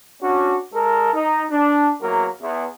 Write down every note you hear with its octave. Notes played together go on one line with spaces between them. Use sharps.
C#4 D4 F#4
G#3 A4 A#4
D#4
D4
E2 F#3 A#3 A#4
E2